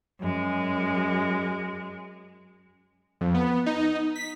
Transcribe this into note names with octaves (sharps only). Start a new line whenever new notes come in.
F#2 G#3
F2
B3
D#4
B6